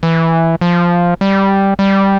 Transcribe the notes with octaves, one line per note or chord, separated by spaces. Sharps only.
E3
F3
G3
G3